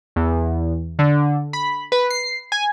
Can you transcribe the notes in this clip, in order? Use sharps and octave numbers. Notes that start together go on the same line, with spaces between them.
E2
D3
B5
B4
C7
G#5